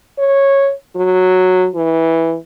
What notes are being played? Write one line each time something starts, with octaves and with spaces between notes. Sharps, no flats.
C#5
F#3
E3